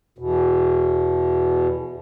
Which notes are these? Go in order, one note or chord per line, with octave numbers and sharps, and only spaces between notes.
E2 B2